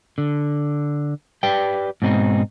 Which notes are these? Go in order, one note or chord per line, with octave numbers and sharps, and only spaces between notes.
D3
G4 B4 D5 G5
G#2 B2 C4 D#4